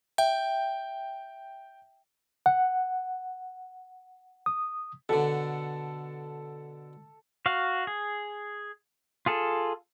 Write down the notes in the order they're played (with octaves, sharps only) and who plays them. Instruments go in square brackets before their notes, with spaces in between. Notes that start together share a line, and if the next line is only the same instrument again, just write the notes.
[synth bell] E5 [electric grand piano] G5
[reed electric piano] F#5
D#6
[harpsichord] B2 D3 [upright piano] A4
[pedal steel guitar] F#4 F5
G#4
F4 G#4 A4